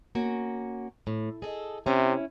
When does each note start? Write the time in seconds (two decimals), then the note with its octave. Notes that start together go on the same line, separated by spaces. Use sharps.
0.15 A#3 C#4 F#4
1.07 A2
1.42 G#4 A4 D#5
1.86 C3 C#4 E4